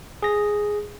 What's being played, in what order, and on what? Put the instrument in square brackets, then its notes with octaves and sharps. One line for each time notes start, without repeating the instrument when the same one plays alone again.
[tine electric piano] G#4 A#6